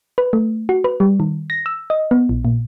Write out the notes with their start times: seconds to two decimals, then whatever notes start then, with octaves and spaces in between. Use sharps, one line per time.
0.18 B4
0.33 A3
0.69 F#4
0.84 B4
1.00 G3
1.20 D#3
1.50 A#6
1.66 E6
1.90 D#5
2.11 B3
2.29 A#1
2.45 A#2